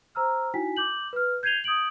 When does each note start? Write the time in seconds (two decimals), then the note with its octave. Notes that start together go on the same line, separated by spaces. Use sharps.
0.15 C5 A#5 E6 F6
0.54 D#4 E4 F#4 G5 G#5 B6
0.77 D6 G6 F#7
1.13 B4 F6
1.43 G6 G#6 C7 D#7 F7 G7
1.64 D#6 G6 G#6 D7 F#7